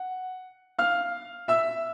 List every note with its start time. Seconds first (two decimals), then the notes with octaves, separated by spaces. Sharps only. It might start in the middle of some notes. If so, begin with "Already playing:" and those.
Already playing: F#5
0.79 F5 F6
1.48 E5 E6